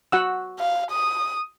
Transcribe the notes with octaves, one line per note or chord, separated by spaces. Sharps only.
F#4 F#5 E6
F5
D#6